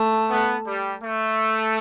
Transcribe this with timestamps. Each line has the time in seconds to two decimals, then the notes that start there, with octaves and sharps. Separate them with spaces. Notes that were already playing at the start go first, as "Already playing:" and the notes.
Already playing: A3
0.30 B3
0.67 G3
1.04 A3